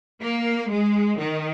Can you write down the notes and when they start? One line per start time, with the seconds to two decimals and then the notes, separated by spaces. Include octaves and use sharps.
0.21 A#3
0.70 G#3
1.20 D#3